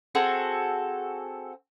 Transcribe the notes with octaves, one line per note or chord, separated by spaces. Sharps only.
C4 F#4 G#4 A4